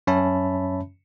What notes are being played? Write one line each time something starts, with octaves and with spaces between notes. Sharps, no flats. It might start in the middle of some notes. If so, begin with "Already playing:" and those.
F#2 C#4 C#5 E5 A5 B5